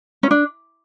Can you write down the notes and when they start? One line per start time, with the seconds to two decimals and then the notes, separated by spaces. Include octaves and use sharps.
0.23 C#4
0.31 D4